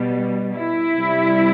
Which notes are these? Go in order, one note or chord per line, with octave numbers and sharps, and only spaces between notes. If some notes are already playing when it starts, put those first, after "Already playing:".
Already playing: B2 G3
E4
C3 G3